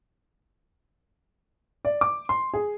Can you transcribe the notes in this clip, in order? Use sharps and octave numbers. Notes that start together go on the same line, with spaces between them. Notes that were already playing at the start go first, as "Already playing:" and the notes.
D5
D6
C6
G#4